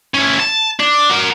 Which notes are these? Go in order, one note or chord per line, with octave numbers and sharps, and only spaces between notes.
C#4 E4
A5
D4
F#4 A#4